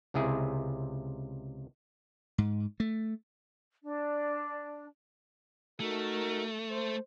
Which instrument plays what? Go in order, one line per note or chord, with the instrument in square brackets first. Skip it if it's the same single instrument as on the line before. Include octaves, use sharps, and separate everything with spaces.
[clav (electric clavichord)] C#2 C3 E4 G#4
[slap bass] G#2
A3
[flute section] D4
[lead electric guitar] A3 [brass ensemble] D#4 F#4 A#4
[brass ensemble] C5